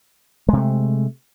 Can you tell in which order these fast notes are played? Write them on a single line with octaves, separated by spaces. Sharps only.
G#3 C3 A3